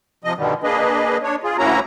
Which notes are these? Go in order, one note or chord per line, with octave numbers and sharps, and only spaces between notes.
C3 F3 D#5
G2 B2 D3 D#3 G3
A#3 D4 G#4 B4 D#5
D4 C#5
F4 G#4
D2 A#3 C#4 E4 F#4 A#5